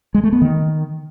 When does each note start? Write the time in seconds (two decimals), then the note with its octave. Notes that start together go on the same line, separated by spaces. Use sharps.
0.14 G#3
0.24 A3
0.33 B3
0.42 D#3